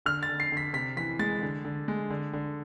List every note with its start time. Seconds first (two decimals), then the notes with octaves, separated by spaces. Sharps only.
0.06 D3 F6
0.23 A6
0.29 D3
0.40 C7
0.52 D3 B6
0.73 C3 B6
0.97 E3 B6
1.19 G#3 A6
1.42 D3
1.65 D3
1.88 G#3
2.10 D3
2.33 D3